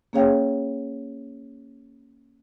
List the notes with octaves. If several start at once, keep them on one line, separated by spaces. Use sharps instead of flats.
A#3 C#4 G#4 C#5 F5 G5